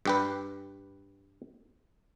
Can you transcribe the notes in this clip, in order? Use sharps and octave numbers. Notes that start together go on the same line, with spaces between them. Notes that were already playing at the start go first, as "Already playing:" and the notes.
G2 G4 B4